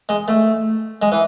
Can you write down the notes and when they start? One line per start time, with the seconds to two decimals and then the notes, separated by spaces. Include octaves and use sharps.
0.09 G#3
0.28 A3
1.02 G#3
1.12 E3